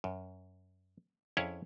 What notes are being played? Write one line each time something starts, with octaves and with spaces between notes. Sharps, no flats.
F#2
F2 C#4 E4 G#4 C#5